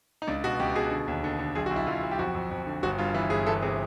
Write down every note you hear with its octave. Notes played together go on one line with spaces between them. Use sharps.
D#4
C#2 D4
B2 F#4
C#2 G4
B2 G#4
D3
D#2
D3
D3
B1 G#4
F#4
B1
E4
B1 F4
B1
G4
F2 F#4
F2
F2
D3
G1 F#4
G2 F4
E3 E4
G1 G#4
E3 A4
C3 G#4